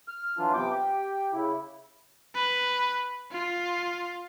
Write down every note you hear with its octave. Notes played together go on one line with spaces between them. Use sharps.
F6
E3 F#3 D4 F4
C3 B3 G5 D6
G4 G5
C#3 E4
B4
F4